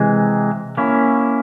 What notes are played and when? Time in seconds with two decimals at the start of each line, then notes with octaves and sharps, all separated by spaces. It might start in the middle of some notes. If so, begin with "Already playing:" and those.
Already playing: C3 E3 G#3
0.77 A#3 C#4 E4